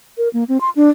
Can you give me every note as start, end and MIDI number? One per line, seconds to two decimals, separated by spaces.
0.18 0.29 70
0.33 0.44 58
0.48 0.60 60
0.61 0.70 84
0.76 0.90 62